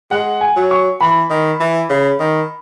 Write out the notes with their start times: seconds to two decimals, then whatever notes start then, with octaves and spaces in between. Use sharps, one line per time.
0.11 G#3 F#5
0.41 G#5
0.56 F#3
0.71 C#6
1.01 E3 B5
1.30 D#3
1.60 E3
1.90 C#3
2.20 D#3